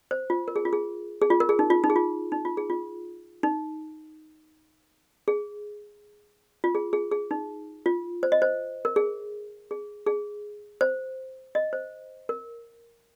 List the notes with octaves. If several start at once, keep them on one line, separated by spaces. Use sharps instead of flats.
C5
F4
A#4
G#4
F4
G#4
G#4
F4
A#4
G#4
D#4
F4
D#4
G#4
F4
D#4
F4
G#4
F4
D#4
G#4
F4
G#4
G#4
G#4
D#4
F4
C5
D#5
C5
A#4
G#4
G#4
G#4
C5
D#5
C5
A#4